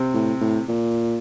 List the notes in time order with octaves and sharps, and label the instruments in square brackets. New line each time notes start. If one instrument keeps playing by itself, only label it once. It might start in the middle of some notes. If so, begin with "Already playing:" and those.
Already playing: [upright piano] C3 C4
[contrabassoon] A2
A2
A#2